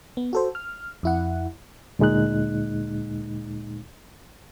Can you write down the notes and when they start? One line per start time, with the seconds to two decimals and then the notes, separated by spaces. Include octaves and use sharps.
0.17 B3
0.33 F#4 A4 C5
0.55 F6
1.03 F2 E4 F#5
1.99 D2 A#2 G#3 D#4 F#6